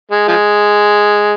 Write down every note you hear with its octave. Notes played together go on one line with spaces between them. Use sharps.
G#3
F3 G#3